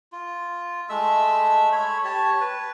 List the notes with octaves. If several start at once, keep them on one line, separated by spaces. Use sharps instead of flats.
F4
G#3 A3 E5 E6
C#5 B5
G4 C#5 A5
B4